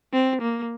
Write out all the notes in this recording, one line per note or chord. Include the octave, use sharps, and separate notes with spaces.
C4
A#3